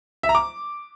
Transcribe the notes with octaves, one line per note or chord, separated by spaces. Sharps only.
E5
A#5
D6